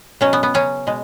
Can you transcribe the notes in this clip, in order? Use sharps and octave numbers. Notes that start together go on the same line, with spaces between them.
B2 F#3 C#4
B3
B3
C#3 F#3 C#4
B2 G#3